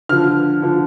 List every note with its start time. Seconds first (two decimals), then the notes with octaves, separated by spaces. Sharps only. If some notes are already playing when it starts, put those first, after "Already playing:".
0.09 D3 F3 F6
0.62 D3 F3